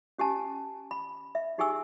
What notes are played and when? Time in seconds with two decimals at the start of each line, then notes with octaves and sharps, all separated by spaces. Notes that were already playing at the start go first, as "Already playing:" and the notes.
0.18 C#4 G4 G#5 A5
0.91 B5
1.35 E5
1.58 D#4 G4 G#4 G#5 C#6 E6